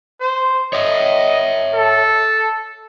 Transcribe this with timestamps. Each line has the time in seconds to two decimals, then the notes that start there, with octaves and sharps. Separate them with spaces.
0.21 C5
0.73 C#5 D#5 E5
1.74 A4